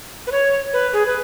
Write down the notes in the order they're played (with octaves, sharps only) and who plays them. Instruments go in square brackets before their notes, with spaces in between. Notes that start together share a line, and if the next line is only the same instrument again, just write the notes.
[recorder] B4
C#5
B4
G#4
B4